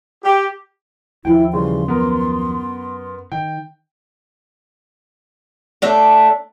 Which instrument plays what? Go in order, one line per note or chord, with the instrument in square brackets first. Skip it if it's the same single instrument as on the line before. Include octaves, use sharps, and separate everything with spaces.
[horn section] G4
[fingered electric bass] D#2 F3 [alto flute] E4 [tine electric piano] G5
[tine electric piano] C#3 E3 G3 [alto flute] C6
[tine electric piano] F#2 [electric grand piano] B3 A#4
[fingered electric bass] D#3 [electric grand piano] G5
[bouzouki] A3 D4 E5